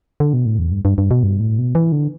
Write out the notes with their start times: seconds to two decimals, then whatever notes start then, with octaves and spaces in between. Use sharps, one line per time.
0.20 D3
0.33 B2
0.46 A2
0.59 E2
0.71 G2
0.85 G2
0.98 G2
1.11 B2
1.23 G2
1.40 A2
1.58 B2
1.75 E3
1.92 D3